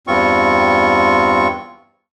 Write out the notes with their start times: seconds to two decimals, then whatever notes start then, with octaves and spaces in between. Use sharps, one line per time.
0.07 E2 G2 C4 F4 C#6